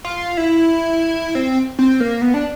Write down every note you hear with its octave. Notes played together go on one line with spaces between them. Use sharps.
F4
E4
C4
C4
A#3
B3
D4